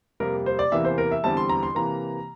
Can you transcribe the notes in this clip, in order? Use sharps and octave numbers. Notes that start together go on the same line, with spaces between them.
F2 C3 G3 A#3 A#4
C5
D5
E2 C3 E3 A#3 E5
C5
A#4
E5
E2 D3 G3 C4 A5
C6
A#5
C6
C3 E3 A#3 A#5